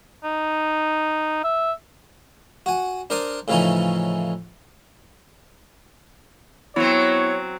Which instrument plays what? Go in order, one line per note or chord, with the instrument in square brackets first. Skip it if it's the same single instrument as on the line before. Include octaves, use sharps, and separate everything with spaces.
[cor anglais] D#4
E5
[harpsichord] F#4 G#5
D4 A#4 C5 D5 D#6
A2 C#3 E3 F3 C#4 D#4
[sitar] F#3 C4 [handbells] B3 E4 [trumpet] C#5